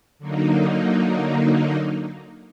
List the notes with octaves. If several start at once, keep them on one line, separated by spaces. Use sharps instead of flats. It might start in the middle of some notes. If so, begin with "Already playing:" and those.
D3 F#3 A#3 D#4